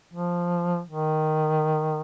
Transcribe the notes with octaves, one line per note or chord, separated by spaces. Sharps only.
F3
D#3